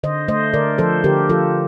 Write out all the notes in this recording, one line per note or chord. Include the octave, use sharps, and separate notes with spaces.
D3 C5 D#5
A3 C5 D#5
D3 A#4 D5
F3 A4 C5
D3 G4 A#4
F3 F4 A4